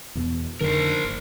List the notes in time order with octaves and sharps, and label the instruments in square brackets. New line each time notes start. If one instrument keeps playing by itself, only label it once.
[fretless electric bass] E2 B2
[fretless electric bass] F2 D3 D#3 [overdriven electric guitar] A#4 C5
[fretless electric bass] F#1